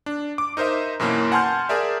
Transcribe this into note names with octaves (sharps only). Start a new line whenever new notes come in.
D4
D6
D#4 A#4 C5 D#5 E5
F#2 B2 E3 A#3 C#4
F#5 G#5 A5 C6 F6 G6
G#4 A#4 D5 E5